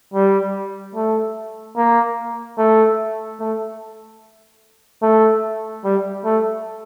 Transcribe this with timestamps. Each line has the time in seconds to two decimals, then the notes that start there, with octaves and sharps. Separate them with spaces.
0.14 G3
0.95 A3
1.77 A#3
2.58 A3
3.40 A3
5.03 A3
5.84 G3
6.25 A3